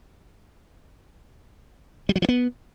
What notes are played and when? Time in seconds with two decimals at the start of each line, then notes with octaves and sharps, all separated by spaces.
2.09 G3
2.16 F#3
2.22 F3
2.29 B3